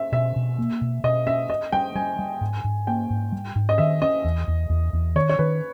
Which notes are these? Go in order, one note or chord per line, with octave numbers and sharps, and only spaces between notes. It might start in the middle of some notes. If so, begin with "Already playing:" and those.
Already playing: E5
B2 E5
B2
A#3
B2
B2 D#5
C#4 E5
C#4 D#5
G3 G5
G3 G#5
G3
G#2
G#2
A#3 G5
G#2
G3
G#2
D#5
D#3 E5
C#4 D#5
E2
E2
E2
E2
D#3 C#5
C#5
D#3 B4